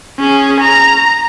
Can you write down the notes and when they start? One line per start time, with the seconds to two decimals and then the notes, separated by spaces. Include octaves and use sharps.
0.19 C#4 G#4
0.61 A#5